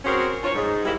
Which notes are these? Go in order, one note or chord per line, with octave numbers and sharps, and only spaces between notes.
C4 C#4 F#4 G#4 A#4 C5
D4 F4 A#4 C5 C#5
G#2
G3 G#3 A#3 E4